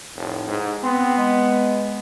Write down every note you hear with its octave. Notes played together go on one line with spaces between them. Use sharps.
F1 A2
G#2
B3 C4
G#3